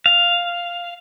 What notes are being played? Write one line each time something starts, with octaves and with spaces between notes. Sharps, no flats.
F5